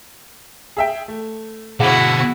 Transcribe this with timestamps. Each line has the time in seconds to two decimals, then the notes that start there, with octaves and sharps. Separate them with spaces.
0.77 G#4 E5 G5
1.08 A3
1.80 B2 D3 E4 F#4 G#4 F5 F#5